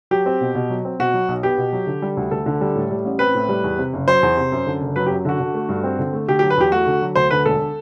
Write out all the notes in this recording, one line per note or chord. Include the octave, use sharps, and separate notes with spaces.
F#3 G4
C4
B2
B2
F#3
C4
B2 F#4
F#3
B1
B3 G4
B2
F#3
D3
G3
D2
D2 A4
D3
G3
A2
G3
A1
C4 B4
A2
G3
E2
C3
F#1
F#3 C5
E2
C3
F#2
D3
F#1
F#3 B4
G4
F#2
D3 F#4
D3
A3
G2
C4
D3
A3
D3 G4
G4
F#3
B4
E2 G4
A3 F#4
D3
F#3
D2 C5
D3 B4
E1 A4